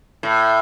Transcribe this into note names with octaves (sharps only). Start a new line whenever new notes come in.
A2